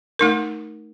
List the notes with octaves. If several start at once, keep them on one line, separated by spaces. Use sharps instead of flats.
A3 D#4 A#4